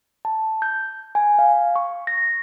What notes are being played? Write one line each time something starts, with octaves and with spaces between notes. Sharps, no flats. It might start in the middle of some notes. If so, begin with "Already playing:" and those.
A5
G6
G#5
F5
C#6
A#6